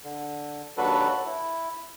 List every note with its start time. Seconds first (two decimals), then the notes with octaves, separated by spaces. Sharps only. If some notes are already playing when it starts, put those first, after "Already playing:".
0.04 D3
0.77 D#2 F#3 D4 F#4 A4 B4
1.26 E4